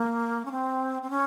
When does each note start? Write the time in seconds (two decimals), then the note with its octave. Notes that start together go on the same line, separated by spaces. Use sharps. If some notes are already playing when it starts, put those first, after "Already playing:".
Already playing: A#3
0.45 C#4
0.51 C4
1.02 C4
1.10 C#4